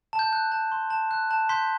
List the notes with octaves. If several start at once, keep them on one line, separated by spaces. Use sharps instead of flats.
A5
G6
F#6
A5
C6
A5
F#6
A5
C6 G6 B6